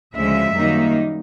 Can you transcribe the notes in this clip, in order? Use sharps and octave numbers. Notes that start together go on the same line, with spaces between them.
D2 C#3 F3 G#3 E5
F#2 D#3 G3 A#3 D#4